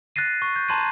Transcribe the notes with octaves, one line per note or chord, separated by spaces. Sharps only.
F#6 A6 A#6 C7 D#7
C#6
G6
A5 A#5 C6 G#6 D#7